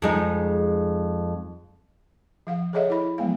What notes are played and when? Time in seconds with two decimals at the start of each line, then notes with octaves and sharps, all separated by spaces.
0.02 F2 G#3 D#4
2.47 F3 F5 F#5
2.73 G#4 A4 C#5 D#5 E5 F#5
2.90 E4 B5
3.18 F3 F#3 G#3 B3 F5